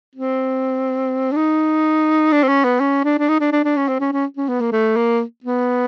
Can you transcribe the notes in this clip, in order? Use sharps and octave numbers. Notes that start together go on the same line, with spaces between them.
C4
D4
D#4
D4
C4
C#4
B3
C#4
D4
D4
D#4
D4
D4
D4
C#4
C4
C#4
C#4
C#4
B3
A#3
A3
A#3
B3